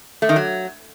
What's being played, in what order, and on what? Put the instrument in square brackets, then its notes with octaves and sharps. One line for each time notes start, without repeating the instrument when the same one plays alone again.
[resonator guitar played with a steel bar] A3
D#3
F#3